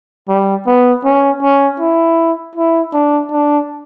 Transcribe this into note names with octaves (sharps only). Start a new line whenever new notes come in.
G3
B3
C#4
C#4
E4
E4
D4
D4